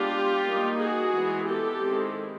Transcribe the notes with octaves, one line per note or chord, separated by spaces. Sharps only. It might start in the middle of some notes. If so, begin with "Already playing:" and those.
Already playing: G#3 B3 D4 F4 G4
G3 A#3 D#4
F#4 G#4
E3 G#3 B3
G4 A4
D#3 G#3 C4 E4